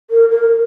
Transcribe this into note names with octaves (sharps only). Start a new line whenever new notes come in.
A#4
A#4